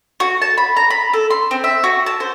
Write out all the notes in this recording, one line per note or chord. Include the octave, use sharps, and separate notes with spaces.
F#4
A5
B5
A#5
B5
A4
C6
C4
E5
F#4
A5
C5